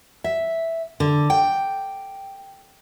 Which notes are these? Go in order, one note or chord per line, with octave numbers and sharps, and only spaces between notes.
E5
D3
G5